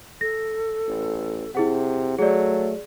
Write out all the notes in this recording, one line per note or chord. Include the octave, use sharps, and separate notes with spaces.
A4 A#6
A1
C3 E4 G#4 F#5
F#3 A3 G#4 D5